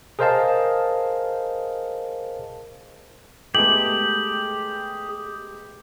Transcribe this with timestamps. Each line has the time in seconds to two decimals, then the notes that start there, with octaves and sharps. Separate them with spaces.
0.19 G#4 A#4 C5 D#5 F5 A5
3.55 G#3 A3 B3 G4 G#4 F#7